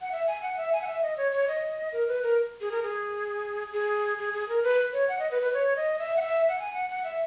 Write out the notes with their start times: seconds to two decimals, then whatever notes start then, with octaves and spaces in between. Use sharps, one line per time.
0.01 F#5
0.12 E5
0.27 G#5
0.42 F#5
0.57 E5
0.73 G#5
0.82 F#5
0.87 E5
1.02 D#5
1.18 C#5
1.32 C#5
1.48 D#5
1.93 A#4
2.08 B4
2.23 A#4
2.61 G#4
2.71 A#4
2.83 G#4
3.73 G#4
4.19 G#4
4.34 G#4
4.49 A#4
4.63 B4
4.93 C#5
5.09 F#5
5.20 D#5
5.31 B4
5.42 B4
5.54 C#5
5.76 D#5
5.99 E5
6.17 F#5
6.21 E5
6.49 F#5
6.59 G#5
6.74 F#5
6.89 F#5
7.04 E5